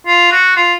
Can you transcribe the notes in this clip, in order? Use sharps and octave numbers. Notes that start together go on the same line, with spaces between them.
F4
F#4
F4